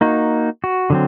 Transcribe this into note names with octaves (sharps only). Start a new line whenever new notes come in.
A#3 D#4 F#4
F#4
D3 F#3 C4